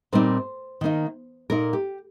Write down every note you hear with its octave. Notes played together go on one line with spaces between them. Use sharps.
A#2 G3 C4 D#4 C5
D#3 A#3 D#4
A#2 A#3 D#4 A#4
G4